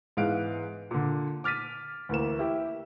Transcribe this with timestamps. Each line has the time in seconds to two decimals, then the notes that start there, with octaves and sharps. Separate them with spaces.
0.17 G#2 E3 B3 F5 F#6 D7
0.91 A#2 D3
1.44 D6 F6 A6 B6 D#7
2.09 D2 E3 A#3 E7
2.39 E4 G4